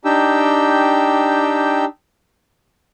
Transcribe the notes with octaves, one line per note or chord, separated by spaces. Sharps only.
D4 D#4 G4 G5 E6